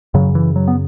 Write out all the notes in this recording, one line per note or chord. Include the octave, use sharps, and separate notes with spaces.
F#2 C#3 F#3
E3
F#3
B3